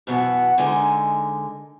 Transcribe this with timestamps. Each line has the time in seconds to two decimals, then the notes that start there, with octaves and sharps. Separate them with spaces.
0.07 F#2 B2 E3 B3 F#5
0.58 D3 G#3 D#4 A#4 G#5